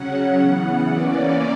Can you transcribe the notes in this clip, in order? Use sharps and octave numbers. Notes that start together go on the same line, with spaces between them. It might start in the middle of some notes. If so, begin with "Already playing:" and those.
Already playing: C#3 F#3 C#4 F#5
C#3 E3 B3
E3 A#3 C#4 D5